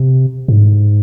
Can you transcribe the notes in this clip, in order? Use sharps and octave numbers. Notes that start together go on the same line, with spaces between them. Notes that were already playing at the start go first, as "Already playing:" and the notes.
Already playing: C3
G#2